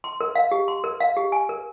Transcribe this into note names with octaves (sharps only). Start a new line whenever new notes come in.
C6
A#4
F5
G4
C6
A#4
F5
G4
G#5
A#4